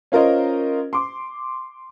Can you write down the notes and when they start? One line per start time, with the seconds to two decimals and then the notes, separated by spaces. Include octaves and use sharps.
0.12 C#4 F4 A#4 C5 D#5
0.93 C6 D6